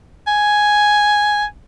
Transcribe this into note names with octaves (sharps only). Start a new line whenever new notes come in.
G#5